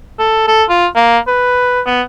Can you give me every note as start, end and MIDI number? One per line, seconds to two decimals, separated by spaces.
0.19 0.47 69
0.48 0.63 69
0.70 0.87 65
0.95 1.18 58
1.27 1.81 71
1.86 2.02 59